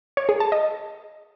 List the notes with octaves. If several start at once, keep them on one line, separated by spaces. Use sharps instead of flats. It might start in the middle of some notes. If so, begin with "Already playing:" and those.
C#5
G#4
A5
D#5